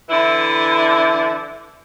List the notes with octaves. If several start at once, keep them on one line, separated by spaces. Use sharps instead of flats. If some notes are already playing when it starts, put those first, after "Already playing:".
D3 E3 E4